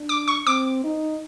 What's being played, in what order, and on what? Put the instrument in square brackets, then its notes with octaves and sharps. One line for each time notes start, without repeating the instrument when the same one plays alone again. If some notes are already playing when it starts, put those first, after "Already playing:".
Already playing: [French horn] D4
[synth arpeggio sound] D6
C#6
[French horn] C4 [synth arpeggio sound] D6
[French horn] D#4